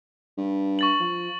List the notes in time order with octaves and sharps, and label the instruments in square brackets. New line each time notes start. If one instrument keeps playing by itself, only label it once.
[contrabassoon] G2
[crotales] C#6 A6 F#7
[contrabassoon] F3